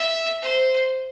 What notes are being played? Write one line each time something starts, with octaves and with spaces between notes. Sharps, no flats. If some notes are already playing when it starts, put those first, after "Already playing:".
Already playing: E5
C5